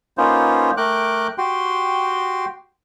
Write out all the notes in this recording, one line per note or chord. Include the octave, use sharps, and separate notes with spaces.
A#3 B3 C#4 D#4 F4 C5
A3 A#4 G5 D6 F#6
F#4 G4 G5 C6